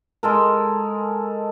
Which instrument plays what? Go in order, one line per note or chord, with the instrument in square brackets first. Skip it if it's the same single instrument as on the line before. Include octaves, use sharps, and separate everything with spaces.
[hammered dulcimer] G#3 A4 A#4